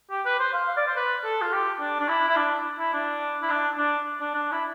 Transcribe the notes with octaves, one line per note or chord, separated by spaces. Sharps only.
G4
B4
C5
F5
F5
D5
C5
B4
A4
F4
G4
D4
D4
E4
E4
D4
E4
D4
E4
D4
D4
D4
D4
E4